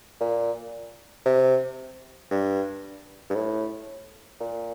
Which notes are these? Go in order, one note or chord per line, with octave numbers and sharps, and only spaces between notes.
A#2
C3
G2
G2
A2
A#2